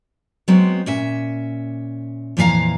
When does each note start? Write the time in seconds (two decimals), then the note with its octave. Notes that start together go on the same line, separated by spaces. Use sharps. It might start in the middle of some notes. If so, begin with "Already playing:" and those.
0.48 F#3 G#3 B3 C4 F#4
0.86 A#2 C#4 E5
2.37 F2 A#2 E3 E4 F5 A#5